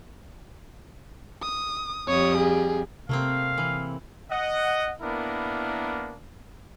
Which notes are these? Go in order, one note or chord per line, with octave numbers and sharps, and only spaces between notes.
D#6
F2 G3 C#5 D#6
G#4
C3 A3 A#3 C4 F5
E3
D#5 F#5
A#3 B3 D4 E4 A#4